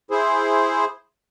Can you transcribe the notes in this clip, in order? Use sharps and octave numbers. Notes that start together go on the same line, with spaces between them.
E4 G#4 C5